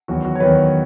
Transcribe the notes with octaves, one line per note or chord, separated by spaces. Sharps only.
E2 D#3 F#3 F#4
F#4
C#5
E2 D#3 F#3 B4